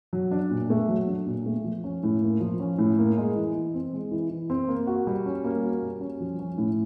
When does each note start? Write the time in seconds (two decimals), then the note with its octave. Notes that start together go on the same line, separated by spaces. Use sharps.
0.13 F#3
0.31 D4
0.51 A#2
0.70 A3
0.89 F#3
1.07 D4
1.27 A#2
1.46 A3
1.65 F3
1.84 C#4
2.03 A2
2.22 A#3
2.40 F3
2.60 C#4
2.78 A2
2.98 A#3
3.17 G#3
3.36 E3
3.55 E3
3.74 C4
3.93 G#3
4.11 E3
4.30 E3
4.50 C4
4.68 A#3
4.87 F#4
5.07 G3
5.26 C#4
5.44 A#3
5.63 F#4
5.83 G3
6.01 C#4
6.20 F3
6.39 C#4
6.58 A2